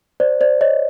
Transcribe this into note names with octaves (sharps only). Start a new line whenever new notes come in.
C5 D5
C5 D5
C#5 D#5